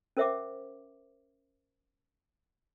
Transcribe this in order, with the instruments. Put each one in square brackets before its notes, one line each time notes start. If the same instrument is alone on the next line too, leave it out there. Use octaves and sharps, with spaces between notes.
[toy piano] C#4 A#4 C5 E5 F#5 D6